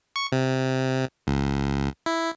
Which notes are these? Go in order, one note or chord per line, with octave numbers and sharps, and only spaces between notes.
C#6
C3
C#2
E4